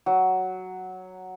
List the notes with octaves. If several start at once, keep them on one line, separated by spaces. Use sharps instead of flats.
F#3